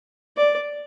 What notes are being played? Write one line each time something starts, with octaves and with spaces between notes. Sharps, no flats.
D5